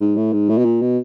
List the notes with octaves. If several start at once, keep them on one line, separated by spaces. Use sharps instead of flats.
G#2
A2
G#2
A2
B2
A#2
B2